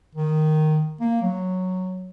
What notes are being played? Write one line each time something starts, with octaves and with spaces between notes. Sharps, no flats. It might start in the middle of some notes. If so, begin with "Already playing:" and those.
D#3
A#3
F#3